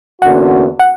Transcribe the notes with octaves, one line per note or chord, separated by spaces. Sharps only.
E2 D3 A#3 C#4 F#4 F#5
F#5